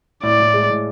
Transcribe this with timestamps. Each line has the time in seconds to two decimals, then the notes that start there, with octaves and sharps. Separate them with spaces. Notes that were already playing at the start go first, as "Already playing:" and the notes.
0.23 A2 D5
0.40 A2
0.54 G#3
0.70 A2